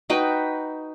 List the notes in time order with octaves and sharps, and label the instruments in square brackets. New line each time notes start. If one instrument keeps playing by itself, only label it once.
[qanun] D#4 F#4 B4 G5